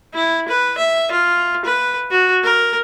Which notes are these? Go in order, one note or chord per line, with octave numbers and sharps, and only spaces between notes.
E4
B4
E5
F4
B4
F#4
A#4